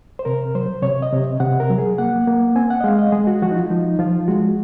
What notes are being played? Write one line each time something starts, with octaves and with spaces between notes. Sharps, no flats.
C5
C3 A#4
F#3 C5
C3 C#5
D#5
C3
C3 F#5
A#4
F#3
G#4
A#3 F#5
A#3
C4 G#5
F#5
D#5
G#3 F5
D#5
G#3 G#4
F#4
F3 F#4
D#4
F4
F3 D#4
F3 F4
G#3 F#4